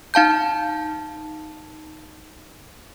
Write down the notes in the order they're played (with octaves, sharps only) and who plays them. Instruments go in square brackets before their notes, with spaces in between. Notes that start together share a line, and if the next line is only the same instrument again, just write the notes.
[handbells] D#4 F5 A5 G6